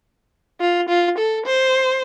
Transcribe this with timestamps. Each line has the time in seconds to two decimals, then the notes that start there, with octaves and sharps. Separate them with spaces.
0.61 F4
0.89 F4
1.18 A4
1.46 C5